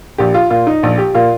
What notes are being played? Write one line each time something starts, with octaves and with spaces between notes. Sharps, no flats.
A#1 G4
F4
A#2 F4
D#4
A#1
G4
A#2 F4